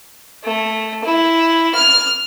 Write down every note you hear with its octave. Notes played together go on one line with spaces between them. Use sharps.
A3
E4
F6